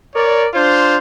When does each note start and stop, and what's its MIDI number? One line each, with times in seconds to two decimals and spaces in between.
0.16 0.46 70
0.16 0.46 73
0.16 0.46 74
0.54 0.97 62
0.54 0.97 65
0.54 0.97 72